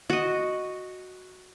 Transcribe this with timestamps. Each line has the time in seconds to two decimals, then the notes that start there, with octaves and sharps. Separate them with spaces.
0.10 F#4 D#5